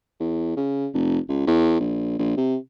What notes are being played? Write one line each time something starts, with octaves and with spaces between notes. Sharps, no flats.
E2
C#3
F1
C#2
E2
A#1
A#1
C3